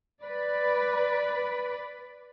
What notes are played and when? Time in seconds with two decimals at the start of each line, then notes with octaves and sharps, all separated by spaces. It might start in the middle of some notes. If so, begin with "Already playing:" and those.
0.22 B4 D5